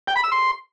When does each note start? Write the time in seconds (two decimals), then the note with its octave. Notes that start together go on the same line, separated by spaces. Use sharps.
0.08 G5
0.16 B5
0.24 E6
0.32 C6